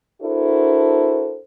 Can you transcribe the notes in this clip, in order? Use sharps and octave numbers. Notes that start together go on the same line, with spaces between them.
D4 E4 F#4 A4 A#4 C5